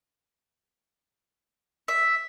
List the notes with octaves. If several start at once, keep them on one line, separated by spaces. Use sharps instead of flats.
E5